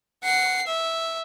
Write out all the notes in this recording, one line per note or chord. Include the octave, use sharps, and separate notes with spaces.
F#5 C7
E5